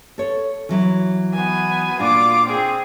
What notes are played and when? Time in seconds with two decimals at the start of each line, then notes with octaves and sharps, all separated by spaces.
0.18 A4 C#5
0.69 E3 F#3 E4
1.33 B3 G#5
1.99 A#2 D4 F4 F#4 D6
2.46 C4 G#4